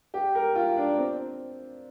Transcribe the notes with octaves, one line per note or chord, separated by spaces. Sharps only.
G4
A#4
F4
D4
C4